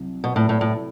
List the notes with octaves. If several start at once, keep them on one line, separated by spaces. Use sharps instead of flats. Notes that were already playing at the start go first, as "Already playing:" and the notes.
Already playing: C2 F#3
B2
A2
A2
A2